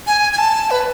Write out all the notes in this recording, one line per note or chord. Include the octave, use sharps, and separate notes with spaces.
G#5
G#5
A5
B4